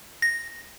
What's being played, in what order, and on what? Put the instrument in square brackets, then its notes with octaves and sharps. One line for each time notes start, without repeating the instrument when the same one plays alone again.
[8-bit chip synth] A#6